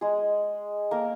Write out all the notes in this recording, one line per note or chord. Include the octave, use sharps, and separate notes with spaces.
G#3 G#4
A#3 A#4